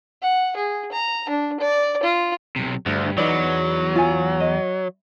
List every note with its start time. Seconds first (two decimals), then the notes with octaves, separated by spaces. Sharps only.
0.22 F#5
0.56 G#4
0.92 A#5
1.29 D4
1.60 D5
2.03 F4
2.56 B1 C3
2.86 D2 G2
3.18 E2 F#3 D#4 B4 D5
3.95 F4 G#5
4.40 D#5